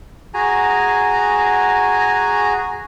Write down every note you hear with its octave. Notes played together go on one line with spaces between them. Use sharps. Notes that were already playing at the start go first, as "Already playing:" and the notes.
F#4 G#4 G#5 A#5